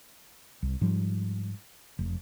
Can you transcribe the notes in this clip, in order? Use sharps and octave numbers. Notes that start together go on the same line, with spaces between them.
C2
G#2 F3 G3
F1